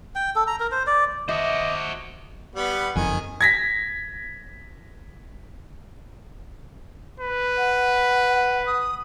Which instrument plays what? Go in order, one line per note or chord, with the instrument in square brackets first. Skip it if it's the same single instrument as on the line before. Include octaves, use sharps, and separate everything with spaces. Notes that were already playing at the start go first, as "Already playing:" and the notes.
[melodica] G5
A4
A#5
A#4
C5
D5
[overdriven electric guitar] F#4 C5 [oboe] D#5 [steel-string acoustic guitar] E5 [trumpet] D6
[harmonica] G3 B3 B4
[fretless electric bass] F#1 F2 [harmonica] D#3 G#5
[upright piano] G#6 A#6 B6
[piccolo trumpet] B4
[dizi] F#5
D#6